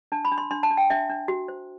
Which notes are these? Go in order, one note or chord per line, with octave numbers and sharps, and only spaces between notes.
D4 A5
B5
D4
C6
D4 C6
A5
D4
G5
D4 E5
D4
F#4
C5